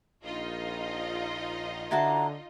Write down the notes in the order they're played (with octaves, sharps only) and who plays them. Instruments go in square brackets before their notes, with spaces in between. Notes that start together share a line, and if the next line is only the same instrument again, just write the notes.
[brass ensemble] A#1 [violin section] D#4 F4 D#5
[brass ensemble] D3 [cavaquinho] E4 F#4 A5 [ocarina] A#5